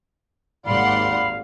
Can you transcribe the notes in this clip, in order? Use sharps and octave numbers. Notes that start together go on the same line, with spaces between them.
G#1 D#2 D5 F5 F#5 B5 C6